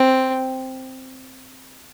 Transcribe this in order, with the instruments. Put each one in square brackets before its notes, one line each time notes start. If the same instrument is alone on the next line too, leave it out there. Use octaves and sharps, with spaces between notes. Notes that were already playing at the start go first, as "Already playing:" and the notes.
Already playing: [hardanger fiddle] C4